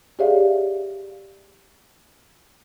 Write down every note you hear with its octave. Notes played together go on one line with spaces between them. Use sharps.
G4 G#4 C#5 D5 E5 F5